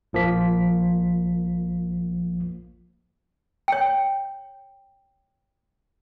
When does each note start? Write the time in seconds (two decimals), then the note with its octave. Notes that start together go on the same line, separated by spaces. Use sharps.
0.13 A#1 F3 A#3 B6
3.68 C#5 G5